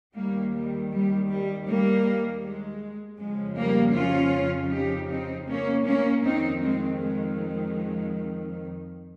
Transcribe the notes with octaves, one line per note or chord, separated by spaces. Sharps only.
D#2 D#3 G3 A#3
G3
G3
G3
G3 A#3
G#3
F2 C#3 F3 G#3
G3 A#3
C#4 F4
D#4 G4
C4 D#4
A#3 C#4
A#3 C#4
F2 D#3 C4 D#4
G#3 C4
G#3
G#3